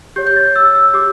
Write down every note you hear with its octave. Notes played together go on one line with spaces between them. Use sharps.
G4 C#5 G6
G6
A6
E6
E6
G4 D6